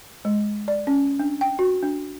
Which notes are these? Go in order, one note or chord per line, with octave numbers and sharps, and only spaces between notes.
G#3
D5
C#4
D4
G5
F#4
D4